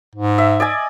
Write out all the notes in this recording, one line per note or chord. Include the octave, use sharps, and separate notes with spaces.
G#2
E5
D5 D#5 G#5